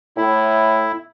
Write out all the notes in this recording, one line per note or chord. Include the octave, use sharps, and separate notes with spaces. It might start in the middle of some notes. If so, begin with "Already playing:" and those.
A2 E4